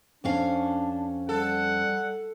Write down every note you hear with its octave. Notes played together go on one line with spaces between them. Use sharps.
F2 C#4 D4 F5
G3 A4 F#5